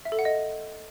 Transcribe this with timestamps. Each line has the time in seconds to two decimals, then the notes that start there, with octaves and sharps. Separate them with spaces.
0.05 E5
0.12 A4
0.19 F#5
0.25 D#5